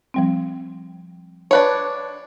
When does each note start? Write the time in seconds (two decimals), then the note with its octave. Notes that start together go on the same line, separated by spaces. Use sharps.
0.14 F3 G3 C4
1.51 D4 B4 C#5